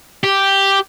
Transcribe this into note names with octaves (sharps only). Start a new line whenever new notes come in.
G4